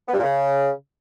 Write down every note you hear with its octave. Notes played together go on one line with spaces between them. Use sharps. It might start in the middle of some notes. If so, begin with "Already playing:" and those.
B3
G2
A#2
C#3